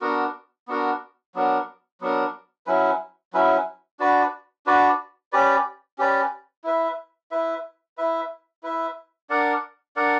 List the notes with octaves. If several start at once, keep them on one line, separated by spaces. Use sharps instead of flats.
B3 D4 F#4 A#4
B3 D4 F#4 A#4
F#3 B3 D4 A#4
F#3 B3 D4 A#4
F#3 C#4 E4 B4
F#3 C#4 E4 B4
D4 F#4 B4 D5
D4 F#4 B4 D5
C#4 G4 B4 D5
C#4 G4 B4 D5
E4 B4 E5
E4 B4 E5
E4 B4 E5
E4 B4 E5
D4 A#4 D5 F#5
D4 A#4 D5 F#5